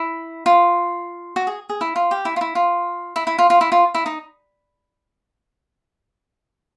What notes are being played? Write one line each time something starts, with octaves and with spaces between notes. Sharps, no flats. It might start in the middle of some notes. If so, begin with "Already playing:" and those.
Already playing: E4
F4
F#4
G#4
G#4
E4
F4
G4
E4
F4
E4
F4
E4
E4
F4
F4
E4
F4
E4
D#4